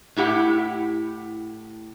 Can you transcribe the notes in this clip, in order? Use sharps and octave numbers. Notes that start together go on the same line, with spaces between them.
A2 E4 G4 F#5